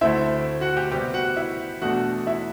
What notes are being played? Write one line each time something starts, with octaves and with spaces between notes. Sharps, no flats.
D2 D3 A3 C4 E4 E5
F#4 F#5
G4 G5
C3 G3 B3 G4 G5
F#4 F#5
E4 E5
E2 B2 A3 D4 F#4 F#5
E4 E5